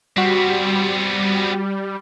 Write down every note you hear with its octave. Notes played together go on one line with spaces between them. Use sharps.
G3 B3 C4 F#4 B6